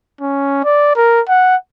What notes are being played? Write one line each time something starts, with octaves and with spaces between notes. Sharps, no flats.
C#4
D5
A#4
F#5